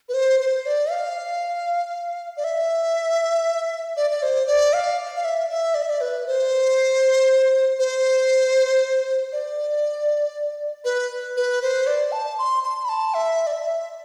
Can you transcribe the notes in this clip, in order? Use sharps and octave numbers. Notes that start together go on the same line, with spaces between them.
B4
C5
C5
D5
F5
D5
E5
D5
D5
C5
D5
F5
F5
E5
E5
D5
E5
D5
B4
C5
C5
D5
B4
B4
C5
D5
A5
C6
C6
B5
A5
E5
D5
E5